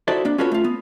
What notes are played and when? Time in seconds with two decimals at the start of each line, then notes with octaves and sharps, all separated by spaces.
0.08 D#4 E4 F#4 A4 C5 D5
0.25 A#3 D4
0.38 C#4 F4 F#4 A4 B4 C#5
0.52 A3 F4
0.64 B3